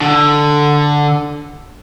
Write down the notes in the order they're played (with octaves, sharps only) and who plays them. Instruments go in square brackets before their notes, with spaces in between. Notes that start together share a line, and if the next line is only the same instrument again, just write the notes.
[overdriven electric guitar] D3